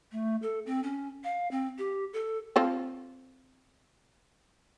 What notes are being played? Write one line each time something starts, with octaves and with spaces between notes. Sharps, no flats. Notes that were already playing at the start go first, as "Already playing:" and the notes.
A3
A4
C4
C#4
F5
C4
G4
A4
C4 F4 A4